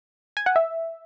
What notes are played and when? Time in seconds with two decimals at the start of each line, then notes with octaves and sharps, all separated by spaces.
0.37 G#5
0.46 F#5
0.56 E5